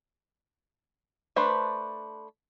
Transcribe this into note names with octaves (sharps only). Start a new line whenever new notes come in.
A3 D4 B4 C5